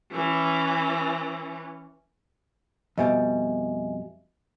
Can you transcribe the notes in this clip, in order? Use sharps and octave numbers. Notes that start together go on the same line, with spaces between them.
E3 C#4
F2 B2 G3 D#5 E5 G#5